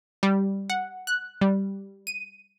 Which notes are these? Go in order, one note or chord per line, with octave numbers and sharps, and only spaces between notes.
G3
F#5
F#6
G3
D#7